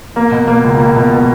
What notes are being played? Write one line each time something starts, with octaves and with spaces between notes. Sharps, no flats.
A#3
B2
A#3
C#2
A#3
B2
B2